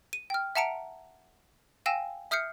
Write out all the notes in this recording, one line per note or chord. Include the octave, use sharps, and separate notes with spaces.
D#7
G5 F6
E5 F#5 A5 A#5 C#7 D7
F5 G5 G#5 E6 A#6 E7
E5 D#6 F6 G6 C7 C#7